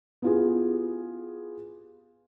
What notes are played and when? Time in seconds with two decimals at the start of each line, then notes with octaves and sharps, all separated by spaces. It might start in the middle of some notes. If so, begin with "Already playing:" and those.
0.22 B3 E4 F4 G4 G#4